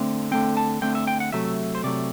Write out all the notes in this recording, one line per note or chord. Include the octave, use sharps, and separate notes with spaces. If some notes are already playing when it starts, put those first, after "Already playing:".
Already playing: D3 A3 C4
D3 A3 C4 G5
A5
D3 A3 C4 G5
E5
G5
F#5
C3 F#3 A3 E5
C5
C3 F#3 A3 D5